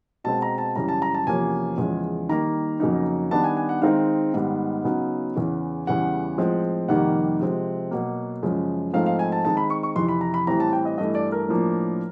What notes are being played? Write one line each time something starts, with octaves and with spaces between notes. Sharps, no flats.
B2 G#3 C4 A5
A#5
A5
F#2 C#3 E3 G3 A#5
A5
A#5
A5
E2 C3 F3 A#3 C#4 G#5
E2 C#3 F3 G#3
D#3 G3 A#3 A#5
F2 C#3 F#3 A#3 D#4
D#3 G3 B3 D4 A5
G#5
G#5
F#5
D#3 G#3 C4 D#4 F5
G#2 D#3 G3 B3
C#3 F#3 B3 D#4
E2 C#3 E3
E2 C#3 E3 G3 F#5
A2 F3 G#3 C4
F2 C3 D#3 G3 A#3 F#5
C3 F3 G#3 C4
B2 F#3 A#3
F#2 C#3 F3 G#3
G#2 F3 A3 C4 D#4 F5
F5
G#5
A5
D#3 G#3 C4 D#4 A5
B5
C#6
C#6
F2 C3 E3 C6
B5
A#5
B5
A2 E3 G3 C4 A#5
A5
G5
D#5
G2 E3 A3 D#5
D5
A#4
A2 F3 A#3 D4